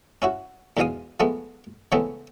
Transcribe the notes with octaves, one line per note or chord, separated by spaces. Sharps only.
C#4 E4 F#4
E2 G#2 B2 G#3 F5 D#6
F3 G#3 A3 B3
C#3 E3 G#3 A3 B3 C4